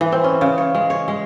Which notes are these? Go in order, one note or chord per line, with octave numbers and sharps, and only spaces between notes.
E3
C4
C#4
C#3
C#5
G#3
C#5
G#3